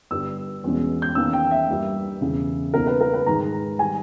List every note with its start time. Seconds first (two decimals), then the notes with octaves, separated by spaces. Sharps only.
0.11 G1 G2 G3 E6
0.64 E2 B2 G#3 C#4
1.02 G6
1.15 E2 D#3 A#3 C#4 E6
1.33 G5
1.51 E5
1.69 G2 G3 A#3
2.21 E1 E2 C#3
2.73 C#2 B2 A#3 D#4 A#4
2.87 B4
3.01 A#4
3.14 B4
3.26 G#2 D#3 G#3 D#4 A#5
3.79 D#3 G3 G#5